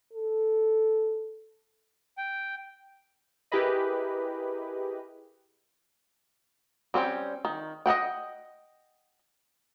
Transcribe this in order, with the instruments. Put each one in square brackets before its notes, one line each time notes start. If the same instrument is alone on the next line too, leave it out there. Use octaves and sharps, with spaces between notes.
[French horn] A4
[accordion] G5
[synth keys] E4 G4 G#4 A#4 B4 D#5
[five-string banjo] G3 C4 C#4 G5
D#3
D#5 E5 F#5 G5